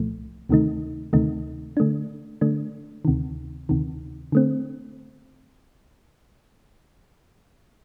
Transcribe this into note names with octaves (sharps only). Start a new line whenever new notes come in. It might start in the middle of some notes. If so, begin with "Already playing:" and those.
Already playing: C2 A#2 F3 A3
D2 C3 D#3 A3 D#4
D2 C3 D#3 A3 D#4
D3 A3 D4
D3 A3 D4
D2 C3 D#3
D2 C3 D#3
D3 A3 C4